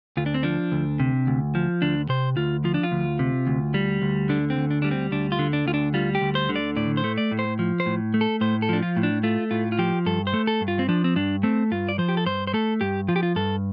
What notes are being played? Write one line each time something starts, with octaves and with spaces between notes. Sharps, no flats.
D2 F4
D4
C4
F3 D4
D2
C3
D2
F3
D2 D4
C3 C5
D2 F4
F3 F4
D4
F4
D2
C3
D2
G3
D2
D3 D4
C4
D2
D4
G3 D4
C4
D2 D4
F4
D3
D4
D2 F4
D4
G3 F4
G4
D2
C5
D3
D5
A2 D5
C5
A3
D5
A2
C5
F3
C5
A2
A3
A4
A2 C5
A4
F3 D4
F4
A2
D4
A3 F4
A2 F4
F4
F3 G4
G2 A4
C5
A3
A4
G2
F4
C4
F3 D4
C4
G2 D4
A3 C4
G2 F4
D5
F3 C5
G4
A4
G2 C5
C5
A3 A4
G2 G4
F3 F4
G4
F4
G2 A4